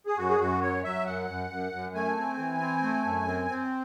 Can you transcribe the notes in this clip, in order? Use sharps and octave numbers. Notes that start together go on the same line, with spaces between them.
G#4
F#2 F#4
G#4
F#2 F#4
F#3 C#5
F#3 E5
F#2 F#5
F#2
F#2
F#2
A3 G#5
C4
E3
C4
A3
F#2
C4
C4